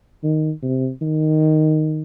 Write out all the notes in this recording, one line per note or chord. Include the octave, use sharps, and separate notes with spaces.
D#3
C3
D#3